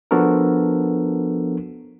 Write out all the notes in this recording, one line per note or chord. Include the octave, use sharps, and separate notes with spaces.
F3 B3 D4 F#4 A4 A#4